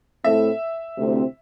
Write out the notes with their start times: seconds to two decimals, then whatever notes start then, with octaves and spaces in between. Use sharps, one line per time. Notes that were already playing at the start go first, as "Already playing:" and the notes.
0.24 A2 A3 C4 E4 A4 E5
0.97 D2 C3 A3 C4 E4